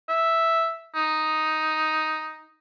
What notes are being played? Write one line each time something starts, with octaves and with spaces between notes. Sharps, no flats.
E5
D#4